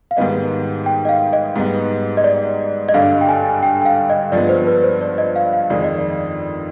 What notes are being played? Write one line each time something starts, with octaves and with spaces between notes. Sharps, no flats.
F5
G#2 D#3 G3 B3 D#5
G5
D#5
F5
D#5
G#2 G3 B3 D#4
D#5
D5
D#5
G2 D3 G3 D4 F5
G5
G#5
G5
G5
F5
D#5
G2 F3 G#3 B3 D5
C5
B4
C5
D5
D#5
F5
F5
F2 D#3 G#3 D5
D#5
D5